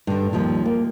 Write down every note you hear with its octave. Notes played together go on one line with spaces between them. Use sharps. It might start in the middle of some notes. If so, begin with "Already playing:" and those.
G2 D3
D#2 F3 G3
A#3